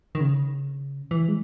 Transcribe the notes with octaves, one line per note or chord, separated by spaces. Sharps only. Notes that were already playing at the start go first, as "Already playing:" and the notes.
D#3
C#3
E3
G#3